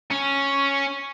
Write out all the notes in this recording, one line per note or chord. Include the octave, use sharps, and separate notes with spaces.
C#4